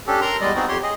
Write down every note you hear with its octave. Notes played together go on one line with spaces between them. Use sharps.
C#4 D4 G4 A4
A#4 A#5 C6
E2 G3 G#3 D5 D#5
B3 C4 D#4 F#4 G#4
F2 G4 C#5 C6
G#4 D#5